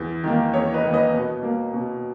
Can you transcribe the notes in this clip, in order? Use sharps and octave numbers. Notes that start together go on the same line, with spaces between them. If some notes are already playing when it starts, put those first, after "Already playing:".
Already playing: E2
D#3 A#3
E2 A#4 C#5
B4 D#5
D#3 A#3
B4 D#5
B2
A#3
B2